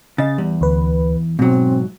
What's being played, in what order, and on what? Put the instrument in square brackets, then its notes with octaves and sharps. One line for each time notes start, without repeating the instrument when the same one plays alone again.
[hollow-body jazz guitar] C#3 [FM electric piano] D#5 A6
[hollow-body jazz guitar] E2 [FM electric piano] G3
[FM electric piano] D2 B4
[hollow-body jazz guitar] G#2 F#3 [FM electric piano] B2 [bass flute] C4